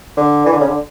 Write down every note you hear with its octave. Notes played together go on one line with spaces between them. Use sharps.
D3
E3
D3
C#3
D3